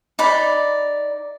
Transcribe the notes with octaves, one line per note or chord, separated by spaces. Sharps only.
D#4 D5 B5